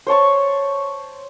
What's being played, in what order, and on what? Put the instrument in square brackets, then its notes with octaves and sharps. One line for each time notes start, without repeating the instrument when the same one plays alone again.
[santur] C5 C#5 A5 C#6